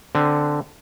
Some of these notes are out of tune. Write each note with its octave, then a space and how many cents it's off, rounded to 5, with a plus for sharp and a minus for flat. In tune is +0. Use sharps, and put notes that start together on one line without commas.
D3 +0 C4 -10